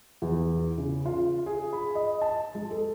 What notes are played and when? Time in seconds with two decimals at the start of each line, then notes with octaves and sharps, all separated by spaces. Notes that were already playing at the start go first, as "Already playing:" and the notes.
0.22 E2
0.78 C#3
1.06 F4
1.46 G#4
1.73 B5
1.95 D#5
2.21 A5
2.55 G#3
2.71 A4